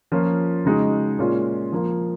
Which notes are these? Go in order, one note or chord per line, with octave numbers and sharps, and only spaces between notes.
F3 A#3 C#4 F4
C#3 G#3 D#4 F#4
A#2 G#3 C#4 F4
F3 A#3 F4